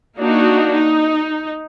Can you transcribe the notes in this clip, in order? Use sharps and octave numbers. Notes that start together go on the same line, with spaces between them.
A#3 D4 D#4 F#4
D#4